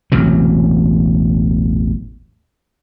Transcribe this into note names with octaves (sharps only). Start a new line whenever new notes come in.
E1 A1 C3 F#3